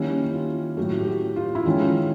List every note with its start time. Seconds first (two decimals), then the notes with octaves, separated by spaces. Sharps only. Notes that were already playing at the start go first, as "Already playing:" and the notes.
Already playing: D#3 G3 A#3 C#4 E4
0.33 F4
0.77 A2 F#3 A3 F#4
0.97 G4
1.07 F#4
1.36 F4
1.55 E4
1.66 D#3 G#3 C#4 F4